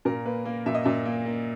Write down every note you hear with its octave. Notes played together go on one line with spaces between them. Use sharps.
A#2 A#4
A#3 B4
A#3
A#2 E5
D#5
A#2 E5
A#3
A#3